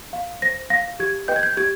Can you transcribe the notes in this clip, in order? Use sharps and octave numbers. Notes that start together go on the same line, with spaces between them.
F5
C5 A#6
F5 A#6
G4 G#6
B4 D#5 G5 G6
G#6
G6
G4 G#6